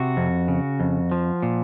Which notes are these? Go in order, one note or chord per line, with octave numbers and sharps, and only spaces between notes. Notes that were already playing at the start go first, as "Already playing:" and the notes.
Already playing: C3 F#4
F2
C#3
F2
F3
A#2